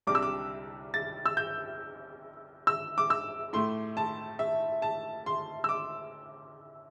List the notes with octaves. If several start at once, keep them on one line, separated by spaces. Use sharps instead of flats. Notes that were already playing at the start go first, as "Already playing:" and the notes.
C2 C3 G3 D4 D6
E6
D6
A6
E6
G6
E6
D6
E6
A2 A3 E4 C6
A5
E5
A5
C6
E6
D6